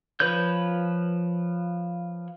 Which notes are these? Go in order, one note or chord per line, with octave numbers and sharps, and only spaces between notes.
F3 B4 C#5 G6